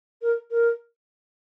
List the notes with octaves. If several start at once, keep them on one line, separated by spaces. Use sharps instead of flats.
A#4
A#4